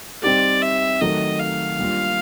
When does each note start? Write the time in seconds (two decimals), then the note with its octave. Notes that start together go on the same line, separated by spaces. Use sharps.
0.23 G3 C4 D#4 G4 D5
0.62 E5
1.01 D#3 F#3 A3 D#5
1.40 F5
1.79 G3 A#3 D4 F4